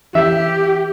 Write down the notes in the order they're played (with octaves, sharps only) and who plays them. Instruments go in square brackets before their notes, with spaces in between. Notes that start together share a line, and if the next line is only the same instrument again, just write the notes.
[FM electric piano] E3 [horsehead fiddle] G4 [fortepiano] E5